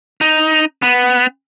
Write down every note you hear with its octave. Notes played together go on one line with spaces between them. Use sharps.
D#4
B3